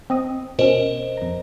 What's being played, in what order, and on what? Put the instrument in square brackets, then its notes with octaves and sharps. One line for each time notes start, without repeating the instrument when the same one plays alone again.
[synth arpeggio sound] C4 D#5 D#6
[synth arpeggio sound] B2 C#4 [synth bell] A#4 C5 D#5
[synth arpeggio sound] F2 A#5